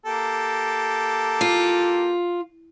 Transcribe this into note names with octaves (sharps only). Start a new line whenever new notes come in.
A#3 G4 A4
F4